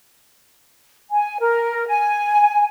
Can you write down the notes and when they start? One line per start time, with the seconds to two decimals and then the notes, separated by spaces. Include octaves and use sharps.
1.11 G#5
1.41 A#4
1.87 G#5